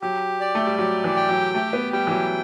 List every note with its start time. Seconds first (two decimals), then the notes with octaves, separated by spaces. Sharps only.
0.02 F#3 G4
0.41 D5
0.55 A3
0.67 G3
0.78 F#3 G4
1.04 E3
1.16 G5
1.29 F#3
1.54 A3 G4
1.73 B3
1.93 G3 G5
2.07 E3
2.11 F#3